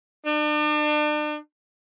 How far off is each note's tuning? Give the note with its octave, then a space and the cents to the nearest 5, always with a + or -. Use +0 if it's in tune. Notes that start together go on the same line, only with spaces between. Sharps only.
D4 +40